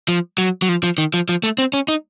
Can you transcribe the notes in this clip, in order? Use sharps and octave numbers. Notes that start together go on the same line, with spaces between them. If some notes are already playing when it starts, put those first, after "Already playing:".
F3
F#3
F#3
F3
F3
D#3
F3
F3
A3
C4
C#4
D#4